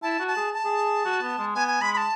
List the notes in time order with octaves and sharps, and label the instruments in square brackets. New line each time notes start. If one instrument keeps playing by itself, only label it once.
[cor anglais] E4 [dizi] A5
[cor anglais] F#4
[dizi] A5
[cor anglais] G#4
[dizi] A5
[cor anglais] G#4
F#4
B3
G#3
[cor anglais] B3 [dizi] G#5
[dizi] G#5
[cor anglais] G#3 [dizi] B5
[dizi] B5
A5